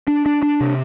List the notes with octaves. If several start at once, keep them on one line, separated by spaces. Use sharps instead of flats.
D4
D4
D4
C3